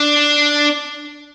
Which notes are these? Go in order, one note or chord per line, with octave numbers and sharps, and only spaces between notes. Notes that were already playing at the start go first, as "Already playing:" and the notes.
Already playing: D4